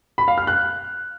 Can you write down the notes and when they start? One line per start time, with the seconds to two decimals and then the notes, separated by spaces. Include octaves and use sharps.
0.18 B5
0.28 F5
0.38 F6
0.47 F#6